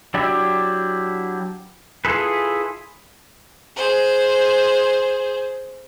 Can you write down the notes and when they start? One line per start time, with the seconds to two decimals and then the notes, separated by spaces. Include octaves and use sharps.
0.14 F#3 D4 E4 G4 E5
2.05 E4 F4 G#4 A4 B4
3.75 G#4 C5